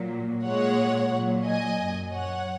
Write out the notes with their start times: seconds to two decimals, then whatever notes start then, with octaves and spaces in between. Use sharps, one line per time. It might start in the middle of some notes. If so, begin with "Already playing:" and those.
Already playing: A#2 F#3
0.44 A#2 G#3 C#5 F#5
1.12 A#2 F#3
1.45 D#5 G#5
1.79 F#2
1.84 F#3
2.12 C#5 F#5